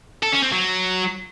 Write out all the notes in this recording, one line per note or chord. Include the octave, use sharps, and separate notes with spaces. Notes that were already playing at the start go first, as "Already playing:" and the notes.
A4
C#4
C4
F#3